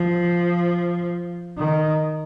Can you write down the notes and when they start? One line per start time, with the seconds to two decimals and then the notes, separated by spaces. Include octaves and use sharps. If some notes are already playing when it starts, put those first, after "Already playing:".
Already playing: F3
1.58 D#3